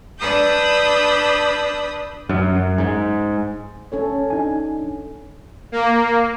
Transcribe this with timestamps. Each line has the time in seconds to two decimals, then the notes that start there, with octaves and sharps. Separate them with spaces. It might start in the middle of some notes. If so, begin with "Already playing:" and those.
0.19 D4 B4 D#6 E6 G6
2.29 F#2
2.55 F#2
2.78 G#2
3.92 C#4 A4 C#5
4.30 D4 D#4 G#5
5.72 A#3